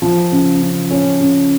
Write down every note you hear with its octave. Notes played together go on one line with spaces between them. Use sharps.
F3
C#3
C#3
C#4
C#3